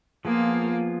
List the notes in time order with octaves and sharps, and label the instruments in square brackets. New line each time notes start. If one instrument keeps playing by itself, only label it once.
[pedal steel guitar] F3 B3 F4 G#4 [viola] A#3